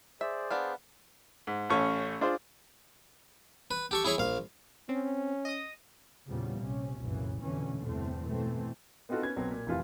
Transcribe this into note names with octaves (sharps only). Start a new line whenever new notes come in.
G#4 C5 D5 E5
B3 D4 F5
G#2
A1 A3 C#4 C#6
D4 F4 G#4 C5
B4
G4 A4 C#6
E4 G#4 C#5 B5
A#1 F5
C4 C#4
D#5 D#6
E2 A#2 C#3 F3 G3 B3
A#1 C3 C#4
F1 C2 F#2 A#2 C#3 E3
F1 F2 B2 D3 E3 C#4
G1 E2 A2 C3 A3 C4
B2 E3 A3 C4
B3 C4 D#4 F4 F#4 A4
B3 C#4 G#6
B1 F#3 B3 C4
A#2
F1 F2 E3 F4 F5